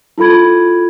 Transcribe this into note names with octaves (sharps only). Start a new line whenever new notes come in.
E4 F4 A4 B5 G#6